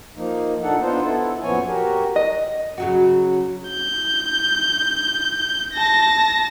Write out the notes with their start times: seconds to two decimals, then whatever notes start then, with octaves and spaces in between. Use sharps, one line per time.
0.17 F3 A#3 D#4
0.63 A#2 D4 D#4 A4 F#5
0.81 B3 D4 D#4 F4 C5
1.04 B3 E4 A4
1.43 F#2 A#2 F3 B3 C#5 G#5
1.68 F#4 G4 A#4
2.16 D#5
2.78 C#3 F#3 F#4
3.70 G6
5.74 A5 A#6